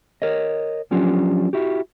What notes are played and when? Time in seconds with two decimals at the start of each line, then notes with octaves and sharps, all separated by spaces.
0.22 A#4 C#5 D#5
0.91 F3 F#3 C#4 D4 F4 G4
1.53 E4 F#4 G4